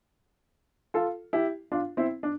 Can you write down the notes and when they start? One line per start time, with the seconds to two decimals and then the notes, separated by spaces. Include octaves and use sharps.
0.94 F4 A4
1.33 E4 G4
1.72 D4 F4
1.97 C4 E4
2.23 D4